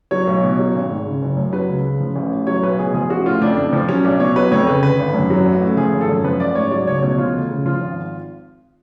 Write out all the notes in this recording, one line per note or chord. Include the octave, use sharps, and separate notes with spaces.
F#3 C#5
B1
B2
F#3
G#1
G#2
C#3
F#1
F#2
F#3 B4
C#2
C#3
F3
A1
A2
F#3 C#5
B1 B4
B2 G#4
F3 G#4
A1 F#4
A2 F4
F2 D4
F2 D4
F3
F#3 C#4
B1 D4
B2 C#5
F#3 B4
F2 C#5
C#3 B4
D3 B4
G#1
F#2
F#3
A1
A2
F3 G#4
G#1
A4
F#2
F3 B4
A1 D5
G#2 C#5
F#3 D5
C#2 C#5
B2 C#5
F3 F4
D2
C#3
F3 F4
G#1